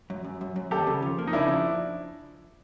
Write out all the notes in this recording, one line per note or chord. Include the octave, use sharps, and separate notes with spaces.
F#2
F#2
F#2
F#2
D#2 G4 A4
C#3
F3
A#3
D#4
C#3 D4 E4
F3